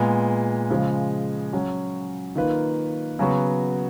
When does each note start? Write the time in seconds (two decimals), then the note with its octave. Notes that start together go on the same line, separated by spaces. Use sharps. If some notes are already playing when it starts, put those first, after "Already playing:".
Already playing: A#2 G#3 B3
0.70 C#3 F3 G#3
1.53 F#3 C#4 F#4
2.35 D#3 A#3 F4 B4
3.19 C#3 F#3 B3 F#4